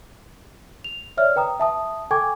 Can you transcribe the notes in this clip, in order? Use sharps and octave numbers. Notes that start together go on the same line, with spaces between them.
F7
C#5 D5 E5 F6
B4 G5 A#5 D#6
E5 A5 D#6
A4 G5 G#5 C#6 D6 G#6